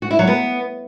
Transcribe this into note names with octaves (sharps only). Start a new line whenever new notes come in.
F#4
E4
F#3
B3